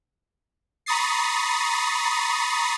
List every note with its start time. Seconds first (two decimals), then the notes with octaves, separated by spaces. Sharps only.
0.86 A#5 B5 C#6 D#6 A6 C7